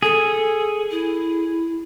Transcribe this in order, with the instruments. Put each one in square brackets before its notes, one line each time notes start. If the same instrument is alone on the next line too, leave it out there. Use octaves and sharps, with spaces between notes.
[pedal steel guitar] G#4 [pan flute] A4
[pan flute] E4